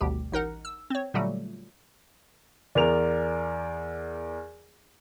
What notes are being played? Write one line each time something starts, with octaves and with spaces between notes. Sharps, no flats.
G#1 D2 B2 G3 G4
A1 D#4 A#4 F#5
E6
C4 C#5
A#2 D3 F#3 G3 A3
E2 A#4 D5 F7